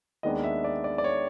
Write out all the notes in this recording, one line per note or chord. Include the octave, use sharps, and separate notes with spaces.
D#2 D#3 G#3 B3 D4 D#5
E5
D5
D5
D5
C#5